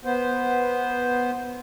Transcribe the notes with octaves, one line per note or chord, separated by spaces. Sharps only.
B3 C5